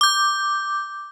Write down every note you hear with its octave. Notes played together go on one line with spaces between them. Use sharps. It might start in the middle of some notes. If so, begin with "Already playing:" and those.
D6 G6